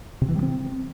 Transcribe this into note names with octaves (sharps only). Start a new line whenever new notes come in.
C3
E3
G3
C4